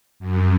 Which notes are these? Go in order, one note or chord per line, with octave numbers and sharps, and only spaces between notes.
F#2